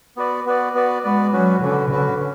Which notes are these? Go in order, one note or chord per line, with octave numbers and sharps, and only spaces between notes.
B3 F#4 B4 D5
B3 F#4 B4 D5
B3 F#4 B4 D5
G#3 B3 F#4 B4 D5
F#3 C#4 F#4 B4
D3 C#4 F#4 B4
D3 C#4 F#4 B4
C#4